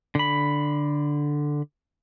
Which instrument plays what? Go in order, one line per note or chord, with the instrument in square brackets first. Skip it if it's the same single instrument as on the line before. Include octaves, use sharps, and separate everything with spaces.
[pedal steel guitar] D3 B5